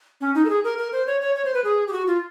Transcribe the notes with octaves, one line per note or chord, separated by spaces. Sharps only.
C#4
D#4
A4
G#4
A#4
A#4
C5
C#5
C#5
C#5
C5
B4
G#4
G4
F#4
F4